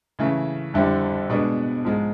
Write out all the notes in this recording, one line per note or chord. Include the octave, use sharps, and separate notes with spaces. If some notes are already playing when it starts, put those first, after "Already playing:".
C#3 E3 A3
F2 D3 G3 C4 E4
B2 G#3 B3 D4
G#2 F3 G#3